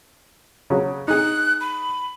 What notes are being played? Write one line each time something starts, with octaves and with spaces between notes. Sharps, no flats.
C#3 F#3
D#4 G#4 F#6
B5